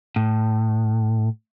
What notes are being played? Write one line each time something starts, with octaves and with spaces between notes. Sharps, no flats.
A2